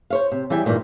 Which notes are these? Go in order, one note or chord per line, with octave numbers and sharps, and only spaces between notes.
C5 C#5 F5
C3
E3 G3 G5 G#5
G2 A#2 D#3 E3 G3